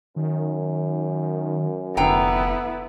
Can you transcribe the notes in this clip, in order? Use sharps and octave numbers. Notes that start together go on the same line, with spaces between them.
F#2 D#3
F1 D3 B3 E4 G5 A#5